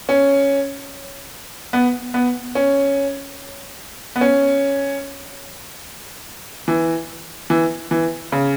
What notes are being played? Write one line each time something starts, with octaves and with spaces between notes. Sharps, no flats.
C#4
B3
B3
C#4
B3
C#4
E3
E3
E3
C#3